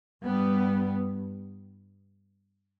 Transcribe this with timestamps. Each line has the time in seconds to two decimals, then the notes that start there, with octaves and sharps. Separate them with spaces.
0.24 G2 G3 B3